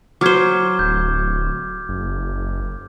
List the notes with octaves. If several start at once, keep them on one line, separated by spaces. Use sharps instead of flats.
F#3 C5 D6 F6 G#6
D1 G6
F#1